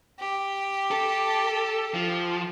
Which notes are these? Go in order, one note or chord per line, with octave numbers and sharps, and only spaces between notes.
G4
A4
F3